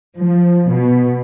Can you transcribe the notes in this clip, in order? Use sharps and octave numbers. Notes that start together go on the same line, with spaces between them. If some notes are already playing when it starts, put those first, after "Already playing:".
F3
B2